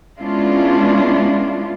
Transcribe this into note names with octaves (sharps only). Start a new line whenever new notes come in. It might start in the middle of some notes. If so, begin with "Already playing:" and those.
G#3 B3 C#4 D4 E4 F4